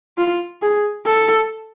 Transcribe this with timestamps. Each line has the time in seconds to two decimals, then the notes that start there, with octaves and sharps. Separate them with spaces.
0.18 F4
0.62 G#4
1.06 A4